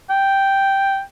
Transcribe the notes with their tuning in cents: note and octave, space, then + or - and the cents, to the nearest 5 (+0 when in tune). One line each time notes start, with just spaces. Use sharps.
G5 -5